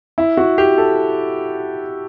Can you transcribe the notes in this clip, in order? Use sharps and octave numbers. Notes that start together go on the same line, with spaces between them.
E4
F#4
G4
A4